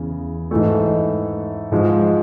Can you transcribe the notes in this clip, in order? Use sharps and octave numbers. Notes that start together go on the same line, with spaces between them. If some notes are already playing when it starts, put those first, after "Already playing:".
Already playing: E2 C#3
G#2 E3 A3
G#2 F3 G#3